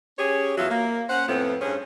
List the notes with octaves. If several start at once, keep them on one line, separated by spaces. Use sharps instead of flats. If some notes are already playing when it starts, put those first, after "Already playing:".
C#4 G4 G#4 C#5
E2 F#3 F4 E5
A#3
C#4 C5 F#5
F2 A2 B3 C4 F4
G2 C#4 G#4 C5